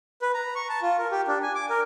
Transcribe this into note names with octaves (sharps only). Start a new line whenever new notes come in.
B4
A#5
C#6
A5
F4
A#4
G4
D4
G#5
D6
A#4